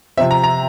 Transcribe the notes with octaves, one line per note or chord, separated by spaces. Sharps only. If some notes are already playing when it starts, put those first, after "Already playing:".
C3 F3 C4 E5
A#5
A#5